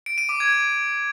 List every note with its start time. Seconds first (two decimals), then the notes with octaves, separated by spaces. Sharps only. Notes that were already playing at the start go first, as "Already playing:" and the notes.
0.06 D7
0.18 D#7
0.29 D6
0.40 G#6